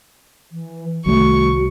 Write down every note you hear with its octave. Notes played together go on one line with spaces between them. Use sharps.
E3
C2 D#3 G3 A3 F#4 C#6